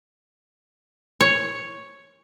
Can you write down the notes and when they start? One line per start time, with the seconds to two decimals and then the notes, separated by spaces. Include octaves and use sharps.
1.21 C#5